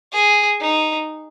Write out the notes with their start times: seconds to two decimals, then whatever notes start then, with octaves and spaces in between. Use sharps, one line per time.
0.12 G#4
0.61 D#4